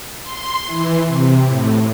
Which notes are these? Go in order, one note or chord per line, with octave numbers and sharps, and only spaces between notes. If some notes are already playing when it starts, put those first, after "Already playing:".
C6
E3
C3
A2